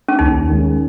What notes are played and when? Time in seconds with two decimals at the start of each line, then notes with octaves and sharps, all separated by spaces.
0.08 C#4
0.19 D#2 D#4
0.49 D#3 G#3 C#4